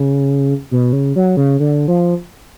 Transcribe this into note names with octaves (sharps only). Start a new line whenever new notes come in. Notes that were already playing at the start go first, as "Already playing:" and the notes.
Already playing: C#3
B2
C#3
F#3
C#3
D3
F3